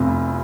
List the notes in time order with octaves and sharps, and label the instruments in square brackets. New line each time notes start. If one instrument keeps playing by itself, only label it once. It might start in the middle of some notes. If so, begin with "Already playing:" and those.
Already playing: [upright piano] F1 F2 C3